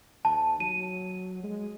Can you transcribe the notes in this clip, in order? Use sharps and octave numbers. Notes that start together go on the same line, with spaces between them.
D#2 A5
F#3 D#7
G#3